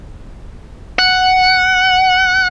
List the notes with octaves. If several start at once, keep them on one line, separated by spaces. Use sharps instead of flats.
F#5